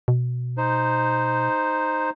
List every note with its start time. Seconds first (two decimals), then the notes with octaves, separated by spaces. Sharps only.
0.08 B2
0.58 D#4 C5